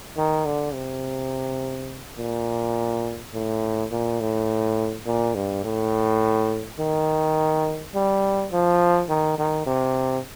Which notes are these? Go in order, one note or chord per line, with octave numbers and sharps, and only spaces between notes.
D#3
D3
C3
A#2
A2
A#2
A2
A#2
G2
A2
D#3
G3
F3
D#3
D#3
C3